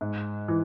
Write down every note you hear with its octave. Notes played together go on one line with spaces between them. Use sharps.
G#2
E3